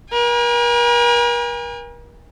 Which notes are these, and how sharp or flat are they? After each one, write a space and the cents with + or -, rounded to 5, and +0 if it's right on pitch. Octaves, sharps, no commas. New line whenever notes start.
A#4 +40 G#5 -40